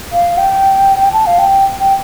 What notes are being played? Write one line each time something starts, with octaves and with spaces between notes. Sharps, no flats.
F5
G5
A5
F5
G5
G5